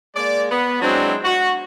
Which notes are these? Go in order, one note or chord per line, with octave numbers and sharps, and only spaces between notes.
G#3 A#3 D5
B3
F#3 G#3 C4 D4 E4
F#4